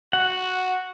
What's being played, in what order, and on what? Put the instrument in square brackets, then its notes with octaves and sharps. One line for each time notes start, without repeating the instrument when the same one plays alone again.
[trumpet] F#4 [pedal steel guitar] F#5